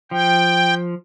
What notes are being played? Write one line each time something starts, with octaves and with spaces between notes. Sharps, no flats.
F3 G5